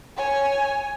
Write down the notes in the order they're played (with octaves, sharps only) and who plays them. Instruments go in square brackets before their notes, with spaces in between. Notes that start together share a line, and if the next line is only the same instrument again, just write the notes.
[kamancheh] C#5 G#5